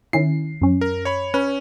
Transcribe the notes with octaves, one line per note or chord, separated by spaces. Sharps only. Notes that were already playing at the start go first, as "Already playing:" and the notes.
D#3 C#4 E4 C7
F#2 C#4
A#4
C#5 B5
C#4 B4